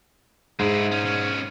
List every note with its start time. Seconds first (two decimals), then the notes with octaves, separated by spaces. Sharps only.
0.59 G#2 G#3 E4
0.92 C#4 D#4
1.03 B2 C#4